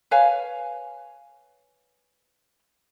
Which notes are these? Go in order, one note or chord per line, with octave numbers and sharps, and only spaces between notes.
B4 C#5 F5 G#5